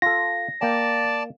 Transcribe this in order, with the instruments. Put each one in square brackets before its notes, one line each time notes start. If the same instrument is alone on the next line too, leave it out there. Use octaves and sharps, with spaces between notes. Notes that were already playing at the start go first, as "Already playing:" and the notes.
[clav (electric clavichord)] F4 A4 [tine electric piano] A#6
[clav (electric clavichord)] A#3 G5 [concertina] D5 A5